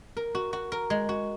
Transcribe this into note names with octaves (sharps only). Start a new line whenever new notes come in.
A#4
F#4
F#4
A#4
G#3
F#4